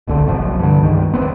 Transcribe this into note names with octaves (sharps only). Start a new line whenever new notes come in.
D1 C2 A#2 D3
F#1 C2 F#2 F3
G2 D3
C#2 G2 D#3
G#1 E2 B3 C4